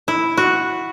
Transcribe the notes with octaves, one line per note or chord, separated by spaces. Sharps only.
E4
F#4